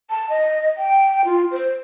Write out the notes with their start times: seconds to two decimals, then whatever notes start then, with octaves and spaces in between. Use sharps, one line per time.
0.10 A5
0.30 D#5
0.78 G5
1.25 F4
1.51 C5